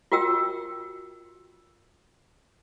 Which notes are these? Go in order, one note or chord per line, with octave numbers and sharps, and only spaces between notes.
F4 F#4 A#4 G5 E6